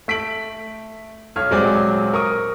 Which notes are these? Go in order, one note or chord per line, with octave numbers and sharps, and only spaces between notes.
A3 B6 D7 F#7
B1 C#5 F6
D#1 F#3 G#3 C4 D5 G#5
A#4 C#6 D#6